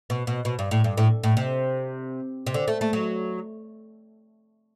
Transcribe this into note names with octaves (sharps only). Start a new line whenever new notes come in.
B2
B2
B2
G2
A2
G2
A2
A2
C3
C3
D3
A3
A3
F#3